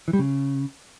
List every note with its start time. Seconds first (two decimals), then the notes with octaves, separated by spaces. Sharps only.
0.08 E3
0.13 G3
0.19 C#3